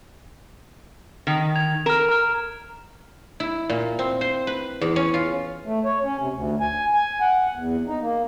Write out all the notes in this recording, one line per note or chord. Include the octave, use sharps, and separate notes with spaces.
D#3
G#6 F7
A#4 F6 E7
A#5 F6
E4
A#2
C4
C5
B4
E2
C#4
F4
A3
C#5
C#4
C3
D2
G#5
G#5
F#5
E2
D#4
A#3